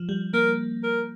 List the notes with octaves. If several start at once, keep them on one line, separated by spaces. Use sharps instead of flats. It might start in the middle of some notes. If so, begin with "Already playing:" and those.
Already playing: F3
G3
A#3 A#4
A#4